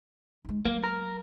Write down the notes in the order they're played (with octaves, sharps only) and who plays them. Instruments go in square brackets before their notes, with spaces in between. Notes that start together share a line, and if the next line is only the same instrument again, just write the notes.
[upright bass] G#3 D#4
[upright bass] F#3 [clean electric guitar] A#3
[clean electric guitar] A#4